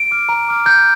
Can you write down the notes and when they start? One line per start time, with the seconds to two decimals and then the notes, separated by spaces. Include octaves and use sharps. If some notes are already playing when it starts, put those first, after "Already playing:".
Already playing: D7
0.11 D6 F6
0.29 A#5
0.48 D6 F6
0.66 A#5 G6